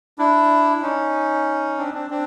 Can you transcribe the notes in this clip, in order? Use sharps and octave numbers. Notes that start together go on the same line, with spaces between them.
D4 E4
E4
C#4 D#4
C4 D4
C4 D4
C4 D4